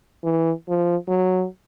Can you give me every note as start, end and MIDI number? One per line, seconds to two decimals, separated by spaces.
0.24 0.52 52
0.69 0.96 53
1.08 1.45 54